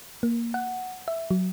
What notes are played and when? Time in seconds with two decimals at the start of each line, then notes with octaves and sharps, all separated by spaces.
0.23 A#3
0.54 F#5
1.08 E5
1.31 F#3